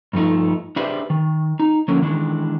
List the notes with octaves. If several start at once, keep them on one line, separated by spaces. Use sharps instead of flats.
G2 F3 A3 D#4
D4 G4 G#4 B4 C5 E5
D#3
D#4
D3 F3 A3 A#3 C#4
D#3 E3 G#3 D4